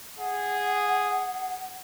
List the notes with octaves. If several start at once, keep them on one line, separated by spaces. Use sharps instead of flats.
G#4 F#5